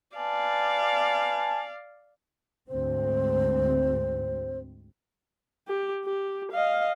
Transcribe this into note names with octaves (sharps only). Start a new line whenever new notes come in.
B4 D5 F5 G#5 A5
D2 G#2 C4 C5
G4
G4
D#5 F5